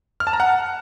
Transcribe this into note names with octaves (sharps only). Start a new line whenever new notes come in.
F6
A5
A#5
F#5